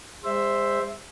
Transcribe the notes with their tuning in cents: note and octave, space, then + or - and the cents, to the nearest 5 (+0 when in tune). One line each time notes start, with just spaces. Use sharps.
G#3 -45 C5 +0 E5 +0